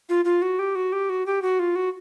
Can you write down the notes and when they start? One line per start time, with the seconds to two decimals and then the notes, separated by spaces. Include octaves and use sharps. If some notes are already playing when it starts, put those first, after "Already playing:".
0.09 F4
0.25 F4
0.42 F#4
0.59 G4
0.75 F#4
0.92 G4
1.10 F#4
1.26 G4
1.42 F#4
1.59 F4
1.76 F#4